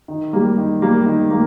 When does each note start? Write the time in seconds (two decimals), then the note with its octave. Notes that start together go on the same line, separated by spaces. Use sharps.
0.08 D#3
0.33 G3 A#3
0.58 D#3
0.82 G3 A#3
1.06 D#3
1.31 A#3